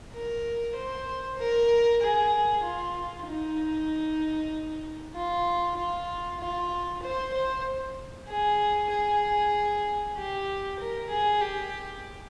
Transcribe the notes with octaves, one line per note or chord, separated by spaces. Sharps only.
A#4
C5
A#4
G#4
F4
D#4
F4
F4
F4
C5
C5
G#4
G#4
G4
A#4
G#4
G4